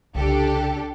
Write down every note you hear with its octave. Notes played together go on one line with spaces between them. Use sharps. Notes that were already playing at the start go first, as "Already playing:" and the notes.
C2 C#3 D4 G4 A4